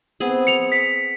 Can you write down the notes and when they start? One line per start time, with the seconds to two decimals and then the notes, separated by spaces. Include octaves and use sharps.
0.20 B3 C4 G#4
0.47 C#7 F7
0.72 B6